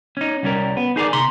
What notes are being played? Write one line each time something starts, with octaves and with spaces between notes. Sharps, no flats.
C#4 D#4
C2 G3 C#4 A#4
B3
D#4 G#4 A#4 D5
C3 A#5 C6